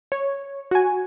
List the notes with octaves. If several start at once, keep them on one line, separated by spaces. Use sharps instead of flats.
C#5
F#4 G#5